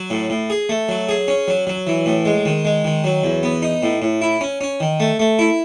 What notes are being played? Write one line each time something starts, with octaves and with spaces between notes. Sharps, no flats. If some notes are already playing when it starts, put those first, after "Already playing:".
Already playing: F#3
A2
A2
G#4
A3
F#3
G#4
C#4
F#3
F#3
E3
A2
G#3
D#3
G#3
D#3
F#3
E2
B3
D#4
A2
A2
E4
C#4
C#4
D#3
A3
A3
E4